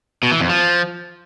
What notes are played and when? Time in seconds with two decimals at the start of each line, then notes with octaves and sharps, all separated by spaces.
0.23 B2
0.32 E3
0.40 F2
0.49 F3